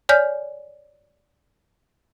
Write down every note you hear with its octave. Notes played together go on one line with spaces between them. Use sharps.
C#5 D5 G#5 F6 G6